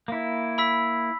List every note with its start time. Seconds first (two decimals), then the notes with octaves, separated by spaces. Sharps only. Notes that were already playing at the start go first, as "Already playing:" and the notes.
0.08 A#3 E4
0.58 B5 E6 B6